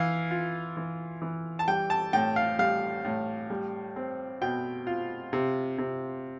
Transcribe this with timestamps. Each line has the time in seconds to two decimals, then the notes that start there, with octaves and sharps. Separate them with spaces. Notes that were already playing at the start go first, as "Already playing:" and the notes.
Already playing: E3 F5
0.31 F4
0.77 E3
1.22 E3
1.59 A5
1.68 G3 G5
1.90 A5
2.13 A2 G5
2.36 F5
2.59 G3 F5
3.05 A2
3.50 G3
3.96 C4
4.41 B2 G5
4.87 F4
5.33 C3
5.78 C3